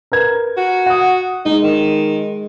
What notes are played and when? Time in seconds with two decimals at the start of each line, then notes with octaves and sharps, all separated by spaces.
0.12 A#4 B4 G#6
0.57 F#4
0.86 F#5 D#6
1.46 G#3 D#4
1.63 D#3